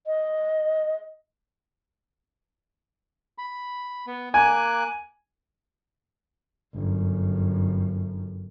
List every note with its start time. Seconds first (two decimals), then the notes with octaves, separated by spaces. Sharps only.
0.07 D#5
3.38 B5
4.07 B3
4.34 A#3 G#5 D6 F#6
6.75 G1 F#2